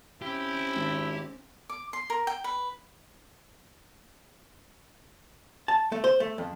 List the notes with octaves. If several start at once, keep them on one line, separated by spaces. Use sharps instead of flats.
C4 C#4 E4 G4
G#1
D6
C6
A#4
G5
B4
A5
A3
C5
A3
F2